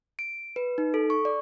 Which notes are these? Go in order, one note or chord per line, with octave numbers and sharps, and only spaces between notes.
D7
B4
D#4
A4
C#6
D5